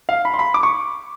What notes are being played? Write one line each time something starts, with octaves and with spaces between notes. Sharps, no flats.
F5
B5
C6
B5
D6
C#6